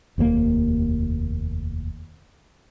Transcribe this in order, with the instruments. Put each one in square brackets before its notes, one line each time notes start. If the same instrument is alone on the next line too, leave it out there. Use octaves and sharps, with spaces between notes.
[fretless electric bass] F1 D#2 G#2 A#3